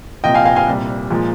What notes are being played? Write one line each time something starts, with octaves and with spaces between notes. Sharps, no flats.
C2 A#2 F3 D#5 G5
F5 G#5
F5 G#5
F5 G#5
C2 A#2 G3
A#2 F3 G#3